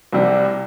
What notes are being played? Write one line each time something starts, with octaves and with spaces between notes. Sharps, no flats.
C2 C3 G3